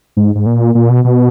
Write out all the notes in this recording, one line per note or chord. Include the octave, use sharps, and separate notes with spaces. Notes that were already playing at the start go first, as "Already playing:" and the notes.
G#2
G#2
A#2
A#2
B2
B2